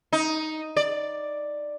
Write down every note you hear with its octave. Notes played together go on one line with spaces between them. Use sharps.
D#4
D5